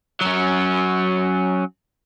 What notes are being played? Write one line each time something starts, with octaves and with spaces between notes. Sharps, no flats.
F#3 C#4